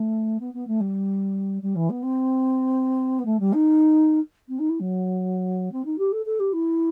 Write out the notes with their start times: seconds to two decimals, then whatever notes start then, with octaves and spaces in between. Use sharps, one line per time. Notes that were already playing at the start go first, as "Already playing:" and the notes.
Already playing: A3
0.39 B3
0.53 B3
0.67 A3
0.80 G3
1.62 G3
1.75 E3
1.89 B3
2.02 C4
3.19 B3
3.25 A3
3.39 G3
3.53 D#4
4.48 C4
4.58 D#4
4.69 E4
4.80 F#3
5.72 C4
5.85 D#4
5.98 G4
6.12 A4
6.25 A4
6.39 G4
6.52 E4